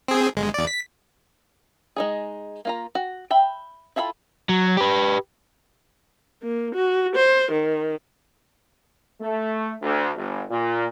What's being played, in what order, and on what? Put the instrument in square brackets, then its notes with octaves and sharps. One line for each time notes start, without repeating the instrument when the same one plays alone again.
[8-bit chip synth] C4 G#4
G1 G#3
E2 D5
B6
[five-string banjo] G#3 D#4 G#4
A#3 F4 A#5
F#4
E5 G5 B5
E4 F4 A4 F5 B5
[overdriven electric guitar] F#3
G4 B4
[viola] A#3
F#4
C5
D#3
[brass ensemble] A3
D2
G1
A#2